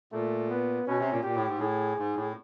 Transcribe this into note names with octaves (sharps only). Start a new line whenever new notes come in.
A#2 A3
B3
B2 C#4
C3
A#2
A#2 G4
A2
G#2
A2 G#4
G#2
A2